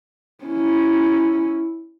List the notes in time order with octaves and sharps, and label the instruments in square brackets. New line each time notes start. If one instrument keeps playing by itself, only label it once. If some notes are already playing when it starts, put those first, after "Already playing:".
[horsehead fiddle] C#4 E4